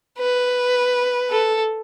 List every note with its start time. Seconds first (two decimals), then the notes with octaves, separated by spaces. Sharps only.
0.18 B4
1.30 A4